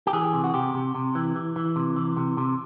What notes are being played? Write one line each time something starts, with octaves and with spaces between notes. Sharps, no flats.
G4
E3 G#4
C3
F#4
C3 G4
C3
C3
E3
E3
E3
C3
E3
C3
C3